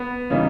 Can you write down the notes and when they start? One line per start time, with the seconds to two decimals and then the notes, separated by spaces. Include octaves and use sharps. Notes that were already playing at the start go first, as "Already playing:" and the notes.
Already playing: B3
0.30 C#3 E3 G3 A#3 D#4